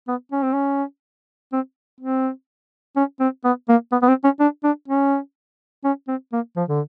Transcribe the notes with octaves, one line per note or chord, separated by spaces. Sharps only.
B3
C#4
C4
C#4
C4
C4
C#4
C4
B3
A#3
B3
B3
C4
C#4
D4
D4
C#4
C#4
C4
A#3
F3
D3